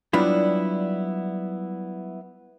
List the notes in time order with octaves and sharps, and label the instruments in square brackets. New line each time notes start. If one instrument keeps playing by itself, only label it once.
[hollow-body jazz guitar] F#3 G3 B3 D4 E4 F4